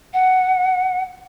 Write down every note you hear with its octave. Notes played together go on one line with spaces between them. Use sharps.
F#5